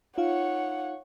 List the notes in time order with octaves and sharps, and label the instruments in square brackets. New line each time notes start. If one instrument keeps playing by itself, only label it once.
[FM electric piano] D#4 F4 F5 [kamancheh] C#5 F#5